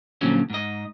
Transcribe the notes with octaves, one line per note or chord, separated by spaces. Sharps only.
A#2 D3 F3 F#3 C#4
G#2 D#5